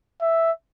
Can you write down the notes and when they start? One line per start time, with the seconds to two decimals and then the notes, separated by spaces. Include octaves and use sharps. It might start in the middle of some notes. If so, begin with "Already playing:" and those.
0.22 E5